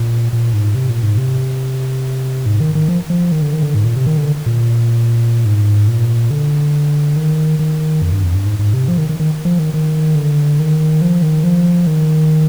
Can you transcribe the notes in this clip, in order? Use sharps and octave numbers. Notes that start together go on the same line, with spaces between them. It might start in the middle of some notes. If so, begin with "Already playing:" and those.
Already playing: A#2
A#2
G#2
C3
A#2
G#2
C3
G#2
D#3
D#3
F3
F3
D#3
D3
D#3
D3
G#2
A#2
C3
D#3
D3
A#2
G#2
A#2
D3
D#3
D#3
F2
G2
F2
G2
G#2
G#2
C3
F3
D#3
D#3
D#3
F3
D#3
D#3
D3
D#3
F3
D#3
F3
D#3